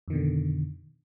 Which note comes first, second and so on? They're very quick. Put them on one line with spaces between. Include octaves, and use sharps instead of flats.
F2 D#3 B2 D3